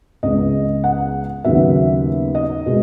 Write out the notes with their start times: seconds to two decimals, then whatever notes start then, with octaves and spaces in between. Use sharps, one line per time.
0.23 C#2 C#3 G#3 B3 D#5
0.84 F#5
1.44 D#2 C#3 F#3 B3 E5
2.35 D#5
2.66 B2 G#3